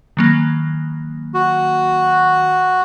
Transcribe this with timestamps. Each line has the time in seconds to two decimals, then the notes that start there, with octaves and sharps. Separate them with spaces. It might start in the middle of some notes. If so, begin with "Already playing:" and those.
0.17 D#3 F#3 A#3
1.34 F#4